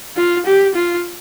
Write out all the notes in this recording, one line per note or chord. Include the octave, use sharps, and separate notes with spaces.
F4
G4
F4